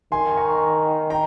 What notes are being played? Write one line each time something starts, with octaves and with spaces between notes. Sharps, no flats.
D#3 G#5 C6
A#5 C#6
G5 A#5